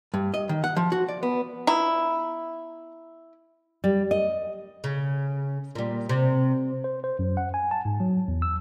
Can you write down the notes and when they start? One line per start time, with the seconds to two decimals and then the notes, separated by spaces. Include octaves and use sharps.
0.14 G2
0.34 D#5
0.49 D#3
0.64 F#5
0.76 F3
0.92 F#4
1.09 D5
1.23 B3
1.67 B3 E4 F4 A#5
3.84 G3
4.11 D#5
4.84 C#3
5.75 A#2 G3
6.09 C3
6.84 C5
7.04 C5
7.19 F#2
7.37 F#5
7.54 G#5
7.71 A5
7.85 G#2
8.00 F#3
8.28 E2
8.42 E6